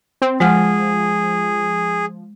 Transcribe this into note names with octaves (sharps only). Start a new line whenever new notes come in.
C4
F3 G#3 G#4 F#5 F6